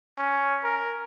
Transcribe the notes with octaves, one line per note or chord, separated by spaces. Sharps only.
C#4
A#4